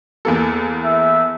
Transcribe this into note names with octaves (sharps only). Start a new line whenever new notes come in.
E2 A#3 A4
E5